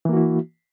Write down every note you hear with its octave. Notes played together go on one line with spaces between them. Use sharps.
E3 A#3 E4 F#4